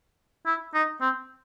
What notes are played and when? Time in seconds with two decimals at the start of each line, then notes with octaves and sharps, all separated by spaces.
0.46 E4
0.74 D#4
1.01 C4